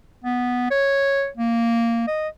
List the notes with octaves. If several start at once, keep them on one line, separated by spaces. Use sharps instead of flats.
B3
C#5
A#3
D#5